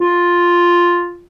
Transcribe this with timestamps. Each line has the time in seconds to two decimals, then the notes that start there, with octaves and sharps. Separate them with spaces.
0.01 F4